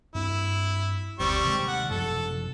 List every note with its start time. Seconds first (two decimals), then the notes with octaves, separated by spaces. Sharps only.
0.15 G2 C4 E4
1.20 F#1 D2 G3 C4 C#6
1.45 C3 D#3 G#3
1.68 F#5
1.90 F#2 C3 F3 A4